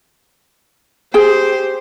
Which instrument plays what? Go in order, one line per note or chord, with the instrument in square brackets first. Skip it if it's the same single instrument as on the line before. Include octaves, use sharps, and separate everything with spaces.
[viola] G4 C5 [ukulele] G#4 G5